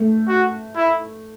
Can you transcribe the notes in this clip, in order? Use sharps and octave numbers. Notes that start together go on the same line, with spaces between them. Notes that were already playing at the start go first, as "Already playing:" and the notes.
Already playing: A3
F#4
E4